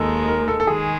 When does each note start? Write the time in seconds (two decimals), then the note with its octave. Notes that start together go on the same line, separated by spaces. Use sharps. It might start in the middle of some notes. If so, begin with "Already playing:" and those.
Already playing: D#2 D#3 G#3 A4
0.28 A#4
0.48 A4
0.60 A4
0.67 D#3 G#3 G#4